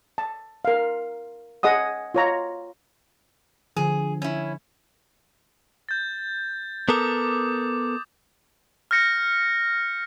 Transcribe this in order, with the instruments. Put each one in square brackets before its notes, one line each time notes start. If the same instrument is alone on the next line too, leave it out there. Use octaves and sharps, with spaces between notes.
[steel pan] A5
A#4 F5
G#4 D#5 F#5 D#6
F4 C#5 A#5
[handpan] D3 F3 [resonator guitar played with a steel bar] G#4
[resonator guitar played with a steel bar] C#4 E4
[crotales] G6 A6
[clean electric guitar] B3 A4 A#4 [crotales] D6 D#6
[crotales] F6 G6 A#6 C#7